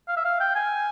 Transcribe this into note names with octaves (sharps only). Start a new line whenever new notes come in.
F5
E5
F5
G5
G#5